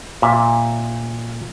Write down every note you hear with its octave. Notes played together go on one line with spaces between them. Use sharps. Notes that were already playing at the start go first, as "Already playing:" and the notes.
A#2 E5